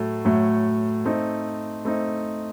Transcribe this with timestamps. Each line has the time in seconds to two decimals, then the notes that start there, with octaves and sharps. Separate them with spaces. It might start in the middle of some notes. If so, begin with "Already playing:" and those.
Already playing: A2 F#3 A3
0.25 A2 F#3 A3
1.05 A3 C4 D#4
1.85 A3 C4 D#4